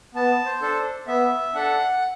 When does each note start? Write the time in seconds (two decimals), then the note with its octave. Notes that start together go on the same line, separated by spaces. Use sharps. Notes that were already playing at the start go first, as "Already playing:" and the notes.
0.15 B3 A5
0.45 C5
0.62 D4 A4
1.07 B3 E5
1.54 D4 A4 F#5